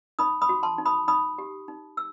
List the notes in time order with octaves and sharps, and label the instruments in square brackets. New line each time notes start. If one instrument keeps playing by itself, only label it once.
[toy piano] D#4 B5 D#6
B5 D#6
F#4
A5 C6
D#4
B5 D#6
D#4 B5 D#6
G4
D#4
E6